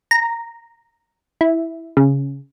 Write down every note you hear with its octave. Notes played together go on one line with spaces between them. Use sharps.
A#5
E4
C#3